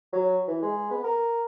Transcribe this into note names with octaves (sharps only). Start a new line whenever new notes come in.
F#3
E3
G#3
B3
A#4